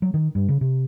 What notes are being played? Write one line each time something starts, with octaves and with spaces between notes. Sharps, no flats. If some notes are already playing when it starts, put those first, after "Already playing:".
F#3
D#3
G2
C#3
C3